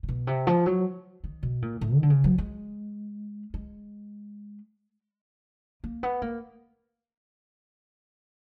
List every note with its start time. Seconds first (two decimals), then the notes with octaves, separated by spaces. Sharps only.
0.03 C3
0.08 B2
0.27 C3
0.47 F3
0.66 F#3
1.24 D#3
1.43 B2
1.62 A#2
1.81 A2
1.95 D#3
2.03 D3
2.10 C#3
2.24 F#3
2.38 G#3
3.54 G#3
5.84 A#3
6.03 B3
6.22 A#3